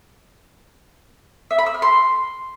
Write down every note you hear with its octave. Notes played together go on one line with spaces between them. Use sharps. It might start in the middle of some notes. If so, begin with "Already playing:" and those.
E5
B5
E6
F6
C6